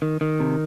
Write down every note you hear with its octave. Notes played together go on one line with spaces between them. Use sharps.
D#3
D#3
C3